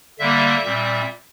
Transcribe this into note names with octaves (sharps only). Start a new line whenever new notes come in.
D3 G3 A#3 E5
A#2 G3 C4